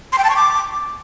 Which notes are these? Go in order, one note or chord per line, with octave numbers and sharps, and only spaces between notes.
C6
G5
A5
C#6
D6